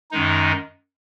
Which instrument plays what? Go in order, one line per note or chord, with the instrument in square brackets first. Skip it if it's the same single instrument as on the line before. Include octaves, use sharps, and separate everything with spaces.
[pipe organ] F#2 D#3 G#3 D#4